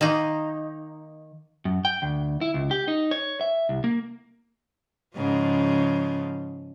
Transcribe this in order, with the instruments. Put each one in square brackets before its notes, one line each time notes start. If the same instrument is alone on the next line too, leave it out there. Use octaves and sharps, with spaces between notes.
[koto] D#3 A#3 D#4
[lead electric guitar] F#2
G5
D2
E4
C#2
G4
D#4
C#5
E5
C2
A#3
[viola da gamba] G#2 C#3 F3